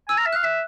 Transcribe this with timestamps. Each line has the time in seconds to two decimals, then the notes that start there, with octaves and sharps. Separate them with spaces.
0.09 G#5 E6
0.17 A#5 F6
0.26 E5
0.33 F#6
0.35 F5
0.43 E5 F#6